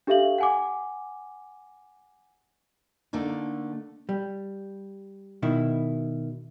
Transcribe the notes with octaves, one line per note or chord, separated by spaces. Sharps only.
D4 G4 A4 E5 F5 F#7
F#5 G#5 D6
D3 A3 A#3 D#4
G3
B2 D#3 E4